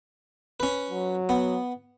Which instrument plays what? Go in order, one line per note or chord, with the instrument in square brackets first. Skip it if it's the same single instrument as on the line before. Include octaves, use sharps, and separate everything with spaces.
[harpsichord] C#4 B4
[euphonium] F#3
[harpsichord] B3